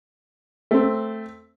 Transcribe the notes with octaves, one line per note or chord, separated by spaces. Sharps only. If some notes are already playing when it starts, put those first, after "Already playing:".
A3 C4